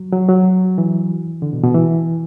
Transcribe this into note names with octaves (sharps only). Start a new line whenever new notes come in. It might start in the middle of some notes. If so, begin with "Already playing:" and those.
Already playing: F#3
F#3
F#3
E3
D3
B2
B2
E3